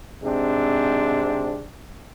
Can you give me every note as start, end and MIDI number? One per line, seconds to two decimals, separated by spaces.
0.23 1.61 44
0.23 1.61 48
0.23 1.61 60
0.23 1.61 62